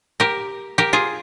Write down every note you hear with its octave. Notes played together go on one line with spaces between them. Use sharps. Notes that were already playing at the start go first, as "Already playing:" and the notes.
G4 A#4
G4 A#4
F4 G#4